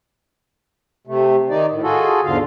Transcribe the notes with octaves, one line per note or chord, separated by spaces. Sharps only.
C3 A3
D#3 D#4 D5
A2
F4 F#4 G#4 A4
E2 G#2 D3 F4 F5